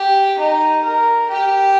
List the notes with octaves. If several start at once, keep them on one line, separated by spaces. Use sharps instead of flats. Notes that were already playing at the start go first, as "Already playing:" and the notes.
Already playing: G4
D#4
A#4
G4